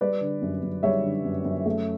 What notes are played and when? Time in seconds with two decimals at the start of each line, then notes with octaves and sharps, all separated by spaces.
0.01 G3 B4 D5
0.21 D3
0.42 F#2
0.63 F#2
0.83 G3 C#5 E5
1.03 D3
1.25 F#2
1.45 F#2
1.66 A3